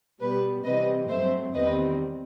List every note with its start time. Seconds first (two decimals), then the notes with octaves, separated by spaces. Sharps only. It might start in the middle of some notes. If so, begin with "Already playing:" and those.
0.21 B2 G3 B3 B4
0.65 C3 E3 G3 C4 B4 D#5
1.09 G2 F#3 A3 C4 C5 E5
1.54 E2 D#3 G3 C4 B4 D#5